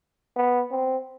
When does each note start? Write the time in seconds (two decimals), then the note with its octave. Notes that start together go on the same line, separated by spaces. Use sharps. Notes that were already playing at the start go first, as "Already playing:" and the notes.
0.36 B3
0.72 C4